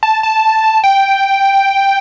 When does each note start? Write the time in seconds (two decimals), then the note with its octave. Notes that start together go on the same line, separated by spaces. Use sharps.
0.03 A5
0.23 A5
0.84 G5